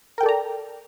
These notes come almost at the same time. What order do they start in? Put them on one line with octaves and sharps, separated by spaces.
A#4 G5 A4 D5 A#5